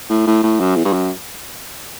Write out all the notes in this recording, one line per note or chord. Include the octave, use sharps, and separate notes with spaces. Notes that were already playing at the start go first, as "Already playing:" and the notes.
A2
A2
A2
F#2
E2
G2
F#2